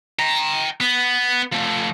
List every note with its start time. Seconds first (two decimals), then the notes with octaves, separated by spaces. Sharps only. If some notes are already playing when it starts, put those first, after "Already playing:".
0.19 G5 A#5
0.81 B3
1.53 F3 A3